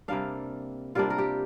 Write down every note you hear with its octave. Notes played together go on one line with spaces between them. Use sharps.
C3 G3 A#3 D4 F5
C3 G3 A#3 D4 F4
A#4
G4